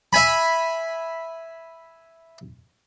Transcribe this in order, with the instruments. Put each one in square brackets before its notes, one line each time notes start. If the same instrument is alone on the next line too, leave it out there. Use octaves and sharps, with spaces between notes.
[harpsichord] E5 G#5 B5